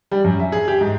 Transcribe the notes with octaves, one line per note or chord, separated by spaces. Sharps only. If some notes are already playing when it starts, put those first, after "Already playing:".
G3
F#2
E5
G#4
G4
G#2